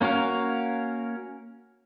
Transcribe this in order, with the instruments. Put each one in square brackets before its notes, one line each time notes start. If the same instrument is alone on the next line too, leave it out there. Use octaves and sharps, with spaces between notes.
[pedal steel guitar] A#3 C#4 F#4 A#4 F5